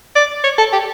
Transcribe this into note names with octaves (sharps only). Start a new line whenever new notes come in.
D5
C#5
A4
G4